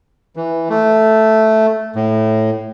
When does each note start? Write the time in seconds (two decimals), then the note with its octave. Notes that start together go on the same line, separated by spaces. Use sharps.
0.36 E3
0.70 A3
1.96 A2